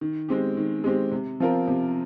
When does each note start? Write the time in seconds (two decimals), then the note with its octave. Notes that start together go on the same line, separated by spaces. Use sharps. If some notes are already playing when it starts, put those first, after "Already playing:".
0.01 D#3
0.29 G#3 C4 G4
0.57 D#3
0.84 G#3 C4 G4
1.12 C3
1.40 F3 C4 F4 A#4
1.68 C3